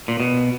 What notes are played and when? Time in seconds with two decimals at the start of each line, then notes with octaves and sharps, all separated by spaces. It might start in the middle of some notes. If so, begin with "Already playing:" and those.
0.08 A#2
0.20 B2